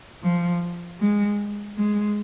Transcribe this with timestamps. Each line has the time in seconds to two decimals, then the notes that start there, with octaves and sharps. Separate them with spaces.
0.23 F3
1.01 G#3
1.77 G#3